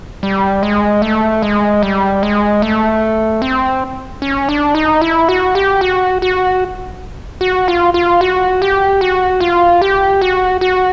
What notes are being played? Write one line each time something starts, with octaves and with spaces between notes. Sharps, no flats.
G3
G#3
A3
G#3
G3
G#3
A3
C4
C#4
D4
D#4
E4
F#4
G4
F#4
F#4
F#4
F4
F4
F#4
G4
F#4
F4
G4
F#4
F#4